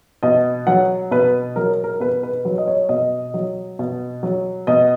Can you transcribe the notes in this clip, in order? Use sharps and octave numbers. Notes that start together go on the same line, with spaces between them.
B2 D#5
F#3 F#5
B2 B4
F#3 A#4
A#4
B2 B4
B4
F#3 B4
D#5
C#5
B2 D#5
F#3
B2
F#3
B2 D#5